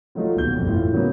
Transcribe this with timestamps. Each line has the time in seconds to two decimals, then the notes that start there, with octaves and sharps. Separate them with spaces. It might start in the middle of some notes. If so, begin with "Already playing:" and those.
0.15 F3 F#3 A3 D#4 F4
0.36 D#1 B2 G6
0.56 G1 F2
0.67 A2 E3 E4 F4
0.92 C#3 F#3 A#3 B3